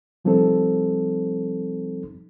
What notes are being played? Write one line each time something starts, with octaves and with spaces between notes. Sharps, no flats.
C3 F3 G3 C4 D#4 A4